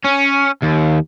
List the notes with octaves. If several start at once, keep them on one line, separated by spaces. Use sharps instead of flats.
C#4
D#2